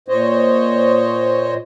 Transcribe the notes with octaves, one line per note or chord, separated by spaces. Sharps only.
A#2 C5 C#5 D#5